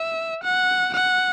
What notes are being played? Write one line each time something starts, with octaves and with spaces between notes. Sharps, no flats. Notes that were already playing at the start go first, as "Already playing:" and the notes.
Already playing: E5
F#5
F#5